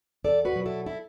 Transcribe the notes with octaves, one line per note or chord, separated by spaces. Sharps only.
E2 A4 D5
F#4 B4
B2 F#3
E4 A4
E4 A4